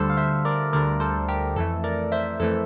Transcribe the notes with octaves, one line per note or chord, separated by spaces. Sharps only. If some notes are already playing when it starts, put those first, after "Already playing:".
Already playing: D2 D3 G3 A4 C5
F5
C5 E5
A#4 D5
D2 D3 G3 A#4 D5
A4 C5
G4 A#4
F2 E3 A3 A4
A#4 D5
C5 E5
F2 E3 A3 A4